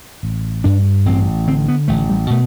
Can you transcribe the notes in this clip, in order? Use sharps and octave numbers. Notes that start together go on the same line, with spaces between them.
A1
G2 D4
A1 C4
D3 C4
B3
A1 A3
G3
B2 A3